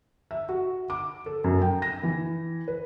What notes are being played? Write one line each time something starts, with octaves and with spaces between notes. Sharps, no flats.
E5
F#4
D6
A4
F#2
G5
A#6
E3
B4